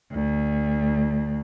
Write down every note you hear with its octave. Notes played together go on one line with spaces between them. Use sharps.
D2